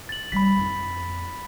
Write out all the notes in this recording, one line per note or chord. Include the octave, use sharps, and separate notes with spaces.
A6 F#7
G3 A#3 B5 B6
F2 D#4